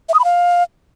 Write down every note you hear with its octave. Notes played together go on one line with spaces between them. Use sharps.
E5
D#6
B5
F5